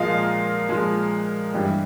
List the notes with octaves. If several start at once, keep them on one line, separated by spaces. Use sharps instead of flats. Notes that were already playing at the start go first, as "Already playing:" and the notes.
Already playing: A#2 F3 G#3 D#5 F5
A#2 F3 G#3
G2 E3 G3